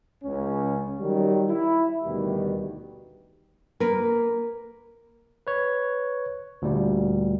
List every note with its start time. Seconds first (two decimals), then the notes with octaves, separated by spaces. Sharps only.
0.24 C#2 C#3 C#4
0.99 D#3 F#3 G3
1.49 E4
2.03 D2 B2 D#3 G3
3.80 A#3 A#4 B4
5.47 B4 C#5
6.62 D2 A#2 G3